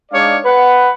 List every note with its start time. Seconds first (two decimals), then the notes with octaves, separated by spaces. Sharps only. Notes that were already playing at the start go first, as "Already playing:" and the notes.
0.12 G#3 D4 D#4 C#5 D5 F5
0.44 B4 F#5